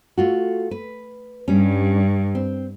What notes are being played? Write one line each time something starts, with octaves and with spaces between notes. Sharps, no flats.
A3 F4 F#4
B4
G2 G3 C#4
C4